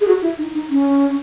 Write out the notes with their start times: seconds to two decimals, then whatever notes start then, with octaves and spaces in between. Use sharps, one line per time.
0.01 G#4
0.08 F#4
0.22 E4
0.38 D#4
0.54 D#4
0.70 C#4